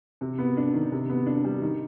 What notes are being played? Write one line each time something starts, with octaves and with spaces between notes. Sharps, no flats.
C3
B3
D4
D#3
C3
B3
D4
G3
D#3